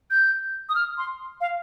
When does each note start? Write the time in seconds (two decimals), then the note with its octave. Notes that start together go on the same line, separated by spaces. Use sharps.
0.11 G6
0.69 D#6
0.75 F6
0.98 C6
1.41 F5